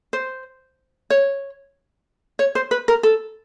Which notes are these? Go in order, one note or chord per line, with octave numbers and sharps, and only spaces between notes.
C5
C#5
C#5
C5
B4
A#4
A4